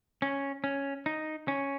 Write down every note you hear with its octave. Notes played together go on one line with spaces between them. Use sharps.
C#4
C#4
D#4
C#4